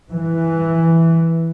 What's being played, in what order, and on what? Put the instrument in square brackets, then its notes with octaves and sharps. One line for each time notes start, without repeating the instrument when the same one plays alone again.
[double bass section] E3